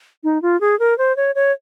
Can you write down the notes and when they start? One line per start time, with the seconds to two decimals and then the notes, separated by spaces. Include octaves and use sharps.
0.24 D#4
0.42 F4
0.61 G#4
0.79 A#4
0.98 C5
1.17 C#5
1.35 C#5